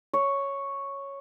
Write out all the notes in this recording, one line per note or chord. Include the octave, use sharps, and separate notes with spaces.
C#5